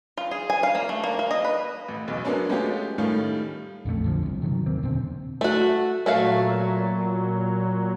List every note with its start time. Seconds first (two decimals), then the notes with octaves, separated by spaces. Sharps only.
0.18 F4
0.31 G#4
0.50 G#5
0.63 F5
0.75 A#3
0.89 A3
1.04 A#3
1.19 A#3
1.31 D#5
1.45 B4
1.88 A1
2.07 E1 B1
2.24 F#3 G#3 A#3 B3 C#4 D4
2.49 G#3 A3 B3 C#4 F4 G4
2.98 A2 D#3 G3 A3 C#4 F4
3.85 A#1 F2 D3 A3
4.04 F2 D3 F3
4.23 G1 C2
4.42 C3 D#3 E3 F#3
4.66 D#2 A#3 C4
4.83 E2 B2 D3 C4
5.41 A3 F#4
6.06 A#2 F#3 A3 F#4 F5